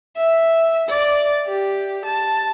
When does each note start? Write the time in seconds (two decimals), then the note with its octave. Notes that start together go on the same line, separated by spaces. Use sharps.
0.17 E5
0.88 D5
1.47 G4
2.05 A5